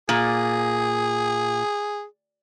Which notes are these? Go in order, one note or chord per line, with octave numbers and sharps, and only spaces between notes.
A#2 G#4